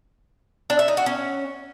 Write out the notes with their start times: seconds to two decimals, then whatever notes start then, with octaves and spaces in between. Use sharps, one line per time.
0.70 D4
0.79 E5
0.88 D#4
0.97 F#4
1.06 C#4